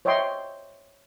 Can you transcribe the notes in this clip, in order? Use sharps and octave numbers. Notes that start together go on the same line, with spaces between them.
C5 C#5 D#5 E5 G5 C6